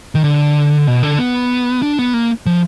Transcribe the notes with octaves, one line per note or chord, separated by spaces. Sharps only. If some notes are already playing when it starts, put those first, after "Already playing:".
D#3
D3
B2
D3
B3
D4
B3
A#3
F3